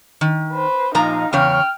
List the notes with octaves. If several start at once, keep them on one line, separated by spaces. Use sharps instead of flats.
D#3
B4 C5
A#2 F3 D#4 F5 A#5
E2 C#3 C#5 G5 F6